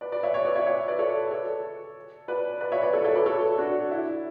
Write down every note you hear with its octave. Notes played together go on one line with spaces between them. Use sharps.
B4 D5
B4 D5
C#5 E5
C#5 E5
B4 D5
C#5 E5
C#5 E5
B4 D5
A4 C#5
A4 C#5
B4 D5
B4 D5
C#5 E5
B4 D5
A4 C#5
A4 C#5
B4 D5
A4 C#5
D4 F#4
E4